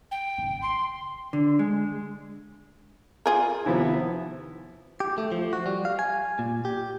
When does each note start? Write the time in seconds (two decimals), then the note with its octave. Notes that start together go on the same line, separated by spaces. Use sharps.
0.11 G5
0.38 G#1 C#3
0.62 C6
1.33 D3
1.59 G#3
3.26 F4 G#4 A#4
3.66 D#2 C3 F3 B3 E4
5.00 G4
5.18 A3
5.32 F3
5.53 F#4
5.66 G3
5.85 F5
5.99 G#5
6.39 A#2
6.65 G4